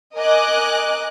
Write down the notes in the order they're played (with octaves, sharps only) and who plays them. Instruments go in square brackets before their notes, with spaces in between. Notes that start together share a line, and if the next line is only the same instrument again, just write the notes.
[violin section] A#4 D#5 G#5 D6 F#6